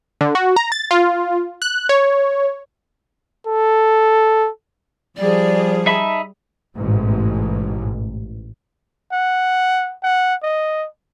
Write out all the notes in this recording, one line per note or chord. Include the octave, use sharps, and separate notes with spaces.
D3
F#4
A#5
A6
F4
F#6
C#5
A4
F3 G3 G#4 D5
D#4 E5 A5 B5
A1 G#2 B2
F#5
F#5
D#5